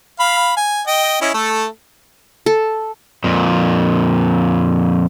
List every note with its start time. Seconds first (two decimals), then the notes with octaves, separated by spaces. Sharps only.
0.20 F5 B5
0.56 G#5
0.87 D#5 G5
1.22 C#4 E4 D#5
1.34 A3 A4
2.46 A4
3.24 F2 A#2